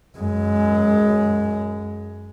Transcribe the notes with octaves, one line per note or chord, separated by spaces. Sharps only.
F#2 G#3